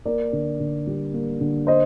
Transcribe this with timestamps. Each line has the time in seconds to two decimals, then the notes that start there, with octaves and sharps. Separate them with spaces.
0.05 A#3 A#4 D5
0.33 D3
0.60 D3
0.87 G3
1.14 A#3
1.41 D3
1.67 C5 D#5